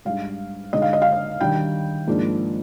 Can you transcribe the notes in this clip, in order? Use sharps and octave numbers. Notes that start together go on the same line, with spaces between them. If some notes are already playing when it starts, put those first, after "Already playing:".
G#2 G3 D4 F5
D3 G#3 D#4 D#5
F5
D#5
F5
D#5
D#3 G3 D4 G5
G#2 F3 A#3 D4